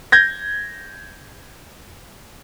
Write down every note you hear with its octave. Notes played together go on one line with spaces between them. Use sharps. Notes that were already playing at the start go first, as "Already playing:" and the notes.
G6 G#6 A#6